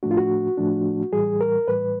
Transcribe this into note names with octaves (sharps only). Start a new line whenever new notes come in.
A2 F3 A3 D4 F#4
F4
F#4
A2 F3 A3 D4
A2 E3 G3 G#4
A#4
A2 E3 G3 B4